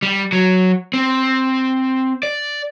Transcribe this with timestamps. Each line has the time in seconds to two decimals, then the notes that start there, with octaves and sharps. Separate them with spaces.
0.03 G3
0.33 F#3
0.94 C4
2.23 D5